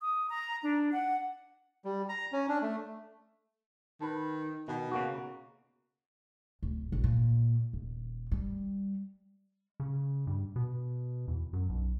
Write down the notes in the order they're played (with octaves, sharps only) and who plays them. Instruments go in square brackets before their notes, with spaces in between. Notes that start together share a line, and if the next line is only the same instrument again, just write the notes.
[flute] D#6
A#5
D4
F#5
[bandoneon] G3
A#5
C#4
D4
A3
[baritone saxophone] D#3 [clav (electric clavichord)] B4 A5
[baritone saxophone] B2 [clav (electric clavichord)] D#3
[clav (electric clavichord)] C#3 A#3 F#4
[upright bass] D1
A1
A#2
D#1
G3
[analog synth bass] C#3
G2
B2
E2
F#2
B1